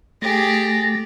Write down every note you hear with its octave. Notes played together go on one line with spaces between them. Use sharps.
A3 G4 G#4 A6 A#6